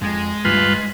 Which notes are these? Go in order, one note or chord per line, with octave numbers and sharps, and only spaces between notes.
F2 G#3
D2 G2 G3 F4 B4